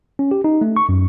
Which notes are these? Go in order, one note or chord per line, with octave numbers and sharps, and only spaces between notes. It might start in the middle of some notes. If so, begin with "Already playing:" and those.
C#4
G4
D#4
A3
C#6
F#2